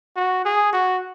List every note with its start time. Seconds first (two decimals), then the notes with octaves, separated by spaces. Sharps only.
0.16 F#4
0.45 G#4
0.73 F#4